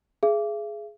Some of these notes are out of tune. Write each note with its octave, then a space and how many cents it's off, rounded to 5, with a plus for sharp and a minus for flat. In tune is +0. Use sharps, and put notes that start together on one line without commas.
G#4 +15 E5 +45